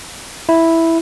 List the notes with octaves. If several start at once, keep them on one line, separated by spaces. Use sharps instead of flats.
E4